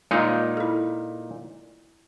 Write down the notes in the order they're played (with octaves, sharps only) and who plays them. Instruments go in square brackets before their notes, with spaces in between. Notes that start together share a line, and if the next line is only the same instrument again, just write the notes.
[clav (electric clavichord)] A#2 D#4 [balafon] G#3 F4 F5
[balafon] E4 A4